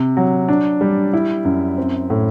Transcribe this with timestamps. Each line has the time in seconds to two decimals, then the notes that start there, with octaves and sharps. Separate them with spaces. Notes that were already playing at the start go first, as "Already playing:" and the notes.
Already playing: C3
0.17 F#3
0.49 D4
0.81 G3
1.14 E4
1.45 F#2
1.78 C4
2.10 A2